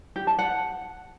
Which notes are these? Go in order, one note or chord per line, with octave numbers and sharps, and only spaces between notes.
G4
A5
F#5